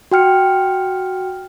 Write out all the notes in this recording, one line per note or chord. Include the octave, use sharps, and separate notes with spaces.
F#4 G5 F6 C#7